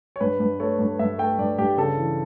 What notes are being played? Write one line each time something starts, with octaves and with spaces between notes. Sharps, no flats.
C#5
G2 B4
G2
A3 C#5
G2
G2 E5
A3 G5
G2 D5
G2 G4
C#3 A4
E3